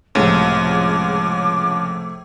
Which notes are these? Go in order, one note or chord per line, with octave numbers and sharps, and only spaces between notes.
C#2 A2 C3 F3 G#4 C#5 D6